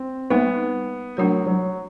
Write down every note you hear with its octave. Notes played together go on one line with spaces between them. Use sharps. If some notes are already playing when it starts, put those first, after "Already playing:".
Already playing: C4
G3 A#3 B3 D#4
F#3 A3 D4 F#4 A#4
F#3